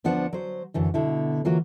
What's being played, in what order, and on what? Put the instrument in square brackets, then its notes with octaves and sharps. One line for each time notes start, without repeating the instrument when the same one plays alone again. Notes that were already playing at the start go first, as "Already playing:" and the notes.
[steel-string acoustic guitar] D2 F3 B3 D4 F#5
F#3 C5
F#2 D3 E3
B2 D3 E4
E3 F#3 A#3 F4 F#4